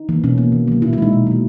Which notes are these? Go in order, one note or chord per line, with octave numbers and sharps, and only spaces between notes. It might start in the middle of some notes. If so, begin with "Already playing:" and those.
Already playing: D#4
E3 A#3
B2 C#4
A#3
D#3
F#3 A#3
A#2 E4
E4
G#3 D#4
B2
F#3 A#3